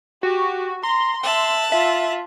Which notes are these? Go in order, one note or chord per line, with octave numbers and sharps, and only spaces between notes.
F#4 G4
A#5 C6
E5 A5 F#6
F4 E5